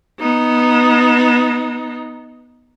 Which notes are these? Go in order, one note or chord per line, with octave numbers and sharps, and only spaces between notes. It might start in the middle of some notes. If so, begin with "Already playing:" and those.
B3 D#4